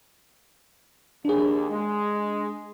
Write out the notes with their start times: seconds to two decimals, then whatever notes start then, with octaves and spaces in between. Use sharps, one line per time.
1.25 D#2 D4 G#4
1.69 G#3